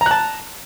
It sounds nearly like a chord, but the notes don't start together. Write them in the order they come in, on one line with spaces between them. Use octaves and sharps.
A#5 F#6 A5